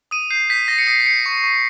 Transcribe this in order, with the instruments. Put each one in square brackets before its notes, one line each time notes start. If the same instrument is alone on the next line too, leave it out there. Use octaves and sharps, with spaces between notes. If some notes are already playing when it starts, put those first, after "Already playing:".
[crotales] D#6 D#7
G6 C7
G6 B6
D#6 A#6
C#7
D#6 C7
C7
G6 C#7
C#6
C#6